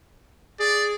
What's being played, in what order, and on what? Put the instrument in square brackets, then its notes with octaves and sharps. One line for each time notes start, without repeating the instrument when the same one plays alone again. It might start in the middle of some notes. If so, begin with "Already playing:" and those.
[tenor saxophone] G#4 [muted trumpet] D5